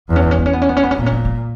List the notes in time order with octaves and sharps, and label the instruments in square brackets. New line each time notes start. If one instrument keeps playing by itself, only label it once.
[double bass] E2 [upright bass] B3
[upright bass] C#4
B3
C#4
B3
C#4
B3
C#4
B3
C#4
B3
C#4
[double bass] A#2 [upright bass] B3
[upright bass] C#4
B3
A#3